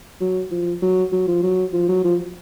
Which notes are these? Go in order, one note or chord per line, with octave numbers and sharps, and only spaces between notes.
F#3
F3
F#3
F#3
F3
F#3
F3
F#3
F3